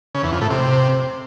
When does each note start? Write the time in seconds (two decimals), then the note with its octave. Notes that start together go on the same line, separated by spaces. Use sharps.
0.15 C#3
0.23 E2
0.32 F2
0.41 A2
0.50 C3